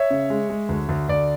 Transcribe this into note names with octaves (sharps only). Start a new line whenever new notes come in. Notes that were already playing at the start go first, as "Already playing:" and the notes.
Already playing: C#5 E5
C#3
G#3
G#3
D2
D2
D2 D5